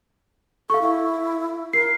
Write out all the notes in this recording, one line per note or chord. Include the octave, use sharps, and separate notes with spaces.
A4 F5 C#6
E4
A#4 C7